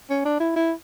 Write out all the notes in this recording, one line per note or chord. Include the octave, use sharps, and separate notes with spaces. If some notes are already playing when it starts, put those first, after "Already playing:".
C#4
D4
E4
E4